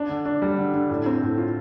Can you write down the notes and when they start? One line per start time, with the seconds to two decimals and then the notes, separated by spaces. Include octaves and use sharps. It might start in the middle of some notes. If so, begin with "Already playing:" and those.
Already playing: D4
0.09 D3
0.25 D4
0.42 G3
0.58 D3
0.74 D3
0.90 A2
1.06 C4
1.22 A2
1.38 F4